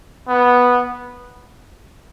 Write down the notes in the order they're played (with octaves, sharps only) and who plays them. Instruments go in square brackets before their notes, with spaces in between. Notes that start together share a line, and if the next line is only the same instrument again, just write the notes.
[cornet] B3